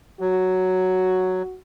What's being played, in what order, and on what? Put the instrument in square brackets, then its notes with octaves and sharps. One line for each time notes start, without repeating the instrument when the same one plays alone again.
[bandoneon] F#3 [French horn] F#4